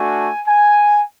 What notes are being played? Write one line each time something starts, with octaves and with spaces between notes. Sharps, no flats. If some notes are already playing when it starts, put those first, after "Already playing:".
Already playing: A3 D4 F#4 G#5
G#5